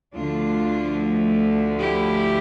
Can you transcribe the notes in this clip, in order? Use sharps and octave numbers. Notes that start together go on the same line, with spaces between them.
D2 D3 F3 A3 D4 F4
E4 G4